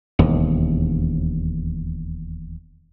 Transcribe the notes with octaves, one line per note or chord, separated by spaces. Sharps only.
E1 D#2